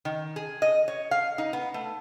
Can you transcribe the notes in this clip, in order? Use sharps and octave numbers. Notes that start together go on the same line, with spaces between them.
D#3
G#4
D#5
C#5
F5
D#4
B3
A3